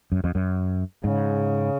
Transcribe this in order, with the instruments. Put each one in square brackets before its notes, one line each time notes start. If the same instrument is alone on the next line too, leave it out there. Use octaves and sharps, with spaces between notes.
[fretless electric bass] F#2
F2
F#2
[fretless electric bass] G#2 [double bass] C#3